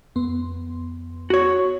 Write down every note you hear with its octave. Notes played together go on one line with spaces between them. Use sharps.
F2 B3 C6
F#4 C#5